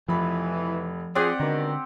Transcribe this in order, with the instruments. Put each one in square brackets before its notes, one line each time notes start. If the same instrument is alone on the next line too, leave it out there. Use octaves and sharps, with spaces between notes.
[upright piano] F1 B5 [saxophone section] E3 [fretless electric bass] F3
[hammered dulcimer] C4 G4 F#5 [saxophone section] F4 G#4 [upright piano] D5
[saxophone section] G#2 B2 D#3 [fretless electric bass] D3